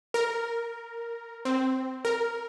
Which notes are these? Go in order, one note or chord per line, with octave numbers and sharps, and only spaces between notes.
A#4
C4
A#4